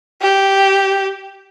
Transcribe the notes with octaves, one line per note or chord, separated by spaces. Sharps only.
G4